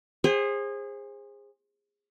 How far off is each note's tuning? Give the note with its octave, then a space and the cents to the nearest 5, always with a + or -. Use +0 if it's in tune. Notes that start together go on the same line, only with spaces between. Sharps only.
G#4 -25 C5 +25